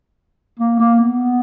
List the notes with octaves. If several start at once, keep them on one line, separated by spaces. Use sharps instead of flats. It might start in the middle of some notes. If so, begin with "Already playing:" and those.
A#3
A#3
B3